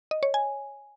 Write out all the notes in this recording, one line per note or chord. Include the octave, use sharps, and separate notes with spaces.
D#5
C#5
G#5